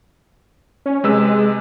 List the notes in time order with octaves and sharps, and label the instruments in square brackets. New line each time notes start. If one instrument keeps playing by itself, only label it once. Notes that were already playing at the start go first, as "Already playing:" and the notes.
[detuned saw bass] C#4
[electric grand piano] C3 B4 E6 [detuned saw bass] G#3